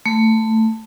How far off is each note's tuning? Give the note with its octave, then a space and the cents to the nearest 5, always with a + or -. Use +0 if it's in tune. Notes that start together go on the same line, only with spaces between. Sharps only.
A3 +10